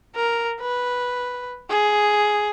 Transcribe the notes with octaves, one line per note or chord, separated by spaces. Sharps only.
A#4
B4
G#4